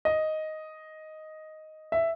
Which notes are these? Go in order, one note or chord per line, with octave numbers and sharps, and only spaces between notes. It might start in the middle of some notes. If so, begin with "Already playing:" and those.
D#5
E5